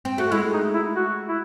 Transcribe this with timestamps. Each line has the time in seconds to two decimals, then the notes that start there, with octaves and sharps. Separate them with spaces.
0.05 C4
0.18 A3 F#4
0.32 G#3 E4
0.54 D#4
0.74 E4
0.96 F#4
1.28 E4